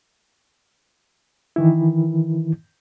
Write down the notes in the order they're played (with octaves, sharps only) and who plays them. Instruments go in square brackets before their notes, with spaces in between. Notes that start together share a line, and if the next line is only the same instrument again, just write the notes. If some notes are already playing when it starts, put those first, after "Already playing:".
[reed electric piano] D#3 E3 E4